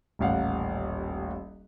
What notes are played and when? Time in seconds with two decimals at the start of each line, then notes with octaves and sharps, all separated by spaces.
0.19 D#1 A1 F5 F#5